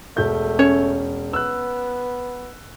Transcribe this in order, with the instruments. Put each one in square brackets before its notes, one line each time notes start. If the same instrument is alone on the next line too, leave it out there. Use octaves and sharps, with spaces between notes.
[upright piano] E1 G6 [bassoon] A3
[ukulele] C#4 C#5
[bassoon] B3 [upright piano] E6 F#6